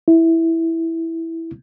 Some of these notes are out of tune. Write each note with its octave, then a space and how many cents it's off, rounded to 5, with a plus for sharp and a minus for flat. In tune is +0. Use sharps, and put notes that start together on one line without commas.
E4 -5